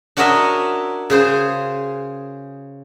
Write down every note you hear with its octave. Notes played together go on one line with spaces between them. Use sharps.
D4 F#4 A#4 C#5 D#5 E5
C#3 G#4 C5